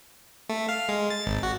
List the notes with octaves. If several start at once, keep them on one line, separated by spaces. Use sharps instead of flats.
A3
F5
G#3
A6
G#1
F#4